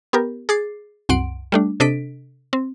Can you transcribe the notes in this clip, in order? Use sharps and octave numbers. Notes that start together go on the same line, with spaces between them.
B3 G4 A#4
G#4 D6 A6 C7
C2 F#2 F#5 C6 D7
G3 A3 D4
C3 D4 A4 D#5 B6 D7
C4